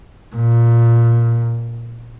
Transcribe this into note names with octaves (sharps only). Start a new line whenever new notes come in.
A#2